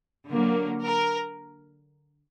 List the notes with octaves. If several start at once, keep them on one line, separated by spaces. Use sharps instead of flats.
D3 F#3 A#3
A#4